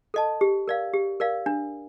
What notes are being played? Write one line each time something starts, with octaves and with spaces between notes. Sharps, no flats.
A4 D#5 A5
G4
A#4 D5 F5
G4
A#4 D5 F5
D4